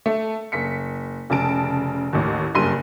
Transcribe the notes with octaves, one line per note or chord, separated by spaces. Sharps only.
A3
F#1 B6 C#7
F1 C#3 A5 D7
A1 D#2
F#1 G2 C6 D#7